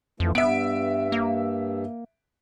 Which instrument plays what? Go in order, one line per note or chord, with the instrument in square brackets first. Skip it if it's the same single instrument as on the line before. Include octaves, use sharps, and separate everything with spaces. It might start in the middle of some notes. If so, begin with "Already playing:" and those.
[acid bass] F2 [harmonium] E3 F3 A3
[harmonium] G2 [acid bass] B3 [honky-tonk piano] E5 D7
[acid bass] A#3